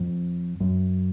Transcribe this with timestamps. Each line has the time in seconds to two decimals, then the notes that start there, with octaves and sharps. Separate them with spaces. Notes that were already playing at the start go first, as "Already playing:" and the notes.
Already playing: F2
0.60 F#2